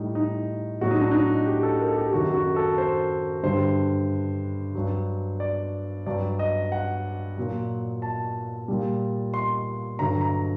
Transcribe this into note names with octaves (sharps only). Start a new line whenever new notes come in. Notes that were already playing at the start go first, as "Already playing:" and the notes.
Already playing: A2 G3 D#4
D#4
A2 F#3 F#4
D#4
D4
D#4
G4
A4
A#4
A4
G4
F#2 D#3 F#3 F#4
F#4
A4
C5
G2 D3 G3 C5
G2 F#3
D5
G2 F#3 D5
D#5
F#5
A#2 F#3
A5
A#2 G3
C6
G2 D3 F#3 A#5
A#5